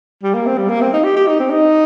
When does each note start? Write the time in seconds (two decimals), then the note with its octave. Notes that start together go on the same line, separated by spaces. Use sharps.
0.23 G3
0.34 A#3
0.47 C4
0.58 G3
0.69 A#3
0.81 C4
0.93 D#4
1.04 G4
1.16 G4
1.27 D#4
1.40 C4
1.51 D#4